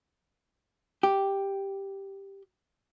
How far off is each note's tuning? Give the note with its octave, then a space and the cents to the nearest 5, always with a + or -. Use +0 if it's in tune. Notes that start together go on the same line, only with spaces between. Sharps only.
G4 +0